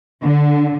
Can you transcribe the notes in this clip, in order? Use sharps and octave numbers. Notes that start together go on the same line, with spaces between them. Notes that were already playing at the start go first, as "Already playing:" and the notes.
D3